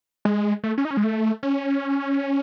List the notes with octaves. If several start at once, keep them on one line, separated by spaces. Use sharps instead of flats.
G#3
A3
C#4
D#4
C#4
G#3
A3
C#4